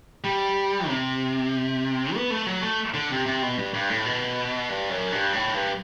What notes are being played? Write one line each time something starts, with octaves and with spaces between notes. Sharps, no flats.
G3
C3
B3
A3
F#3
A3
D3
C3
C3
B2
G2
G2
A2
B2
G2
F#2
G2
A2
G2